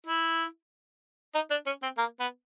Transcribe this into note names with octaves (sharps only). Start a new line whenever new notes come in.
E4
D#4
D4
C#4
C4
A#3
B3